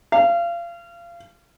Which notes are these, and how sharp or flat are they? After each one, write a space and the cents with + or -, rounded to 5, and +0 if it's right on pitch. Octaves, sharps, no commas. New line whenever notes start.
F5 -30